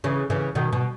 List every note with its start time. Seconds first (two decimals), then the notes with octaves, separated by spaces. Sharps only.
0.04 C#3 E3
0.30 C#3 E3
0.55 B2 D#3
0.73 B2